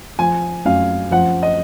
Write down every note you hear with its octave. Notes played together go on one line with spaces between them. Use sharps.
F3 G#5
F#2 F5
F3 F#5
D#5